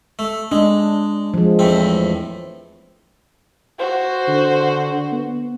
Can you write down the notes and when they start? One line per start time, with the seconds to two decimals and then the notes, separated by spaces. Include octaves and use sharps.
0.19 A3
0.52 G#3 D4
1.34 F3 G#3
1.59 E2 A2 C4
3.79 F#4 C5
4.28 D3
5.12 B3